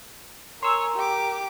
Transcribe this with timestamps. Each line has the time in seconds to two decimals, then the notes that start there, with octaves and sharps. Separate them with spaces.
0.63 A#4 C#5 G#5 C6 E6
0.95 G4 D6